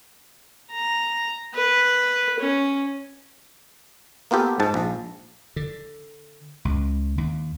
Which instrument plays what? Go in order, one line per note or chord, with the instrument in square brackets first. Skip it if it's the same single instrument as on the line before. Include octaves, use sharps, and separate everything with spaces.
[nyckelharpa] A#5
B4
C#4
[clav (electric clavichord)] A#3 B3 F4 G4 A4
G#2 A5
A#1
[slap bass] D3
C#2
D#2